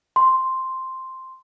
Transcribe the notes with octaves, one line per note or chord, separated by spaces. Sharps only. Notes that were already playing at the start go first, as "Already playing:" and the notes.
C6